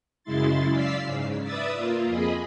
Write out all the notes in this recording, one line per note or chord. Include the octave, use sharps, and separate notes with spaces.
F#2 C#3 G#3 E4 C6 A6
D5 F5 E6 B6 C7
G#2 C#3
B4 D5 E5 D#6 E6 A6
A#3 F4
F2 G#4 D#5 B5